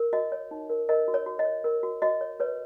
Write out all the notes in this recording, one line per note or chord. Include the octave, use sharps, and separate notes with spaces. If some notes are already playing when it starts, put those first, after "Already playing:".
Already playing: A#4
F#4 D#5
C#5
D#4
A#4
A#4 D#5
F#4
C#5
F#4
D#5
C#5
A#4
F#4
F#4 D#5
C#5
B4 C#5